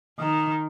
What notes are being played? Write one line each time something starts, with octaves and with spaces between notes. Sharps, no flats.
D#3